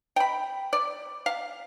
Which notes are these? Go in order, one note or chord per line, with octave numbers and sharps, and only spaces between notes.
G5 B5
D5
F5